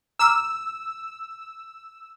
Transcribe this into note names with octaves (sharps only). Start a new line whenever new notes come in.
A#5 D6 E6 F6